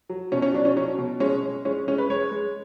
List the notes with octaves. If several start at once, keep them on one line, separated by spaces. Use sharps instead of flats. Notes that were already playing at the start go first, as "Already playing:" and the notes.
F#3
B2 C#4
C#4
F#3 D4
C#4
F#3 C#4
B2
G#3 C#4
G#3
G#3 C#4
G#3 C#4
B4
G#3 C#5
G#3